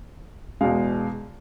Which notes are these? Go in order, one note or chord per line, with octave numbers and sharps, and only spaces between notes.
E2 B2 G#3 F5